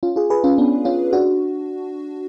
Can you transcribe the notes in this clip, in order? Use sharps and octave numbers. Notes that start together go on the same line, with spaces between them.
C#4 F4
F4 G#4
G#4 B4
C#4 F4
B3 D4
C#4 F4
D4 F#4